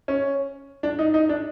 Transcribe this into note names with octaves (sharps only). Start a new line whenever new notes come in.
C#4
D4
D#4
D#4
D4